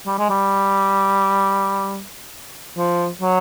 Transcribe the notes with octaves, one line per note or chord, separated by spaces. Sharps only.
G3
G#3
G3
F3
F#3